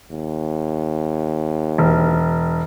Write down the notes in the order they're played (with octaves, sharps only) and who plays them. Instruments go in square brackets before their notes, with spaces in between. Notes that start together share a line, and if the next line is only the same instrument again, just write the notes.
[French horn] D#2
[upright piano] E1